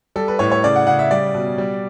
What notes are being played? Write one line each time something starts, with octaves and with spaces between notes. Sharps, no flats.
G3 A4
B4
A2 C#5
C#5
C#3 D5
F#5
C#3 F#5
E5
G3 D5
B2
G3